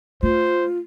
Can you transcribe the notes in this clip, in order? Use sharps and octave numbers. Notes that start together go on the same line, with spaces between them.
A3 F4 C5